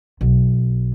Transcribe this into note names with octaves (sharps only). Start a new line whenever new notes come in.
B1